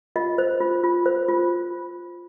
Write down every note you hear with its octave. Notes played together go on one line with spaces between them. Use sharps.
F4 D#5
C5
F4
F4
C5
F4